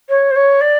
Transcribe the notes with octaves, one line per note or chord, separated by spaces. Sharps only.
C#5
C5
C#5
D5